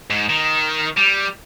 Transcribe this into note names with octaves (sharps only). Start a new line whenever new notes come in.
G#2
D#3
G3